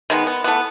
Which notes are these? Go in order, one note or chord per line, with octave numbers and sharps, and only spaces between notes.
D#3 G#3 B3
B3
E3 A3 B3